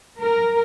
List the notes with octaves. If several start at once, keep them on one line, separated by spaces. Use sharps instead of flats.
A#4